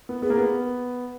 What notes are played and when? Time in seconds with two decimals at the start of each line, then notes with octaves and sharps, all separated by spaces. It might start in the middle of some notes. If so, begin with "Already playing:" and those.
0.09 B3
0.22 B3 G#4
0.30 A#3
0.37 B3